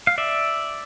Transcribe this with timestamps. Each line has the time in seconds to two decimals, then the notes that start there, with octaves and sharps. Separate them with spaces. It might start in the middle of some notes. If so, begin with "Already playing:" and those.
0.07 F5
0.18 D5 E5